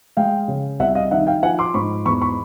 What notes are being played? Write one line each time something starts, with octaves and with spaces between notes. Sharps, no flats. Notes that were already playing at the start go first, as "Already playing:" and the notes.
G#3 F5 G5
C#3
C2 E5 F#5
D#5 F5
D#3 E5 F#5
F5 G5
F3 F#5 G#5
C6 D6
G#2 B5 C#6
E2 B5 C#6
B5 C#6